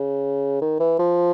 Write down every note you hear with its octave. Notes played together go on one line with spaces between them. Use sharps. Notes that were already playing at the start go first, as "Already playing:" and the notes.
Already playing: C#3
D#3
E3
F3